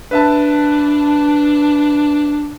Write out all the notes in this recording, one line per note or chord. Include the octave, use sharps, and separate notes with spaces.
D4 B4 E5 A5